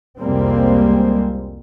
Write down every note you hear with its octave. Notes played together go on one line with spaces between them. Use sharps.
C2 F2 G3 G#3 A#3 C4